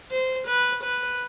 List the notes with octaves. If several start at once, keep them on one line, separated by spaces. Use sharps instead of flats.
C5
B4
B4